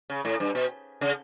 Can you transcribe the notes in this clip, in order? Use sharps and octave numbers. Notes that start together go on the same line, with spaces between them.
C#3
A2
G2
B2
C#3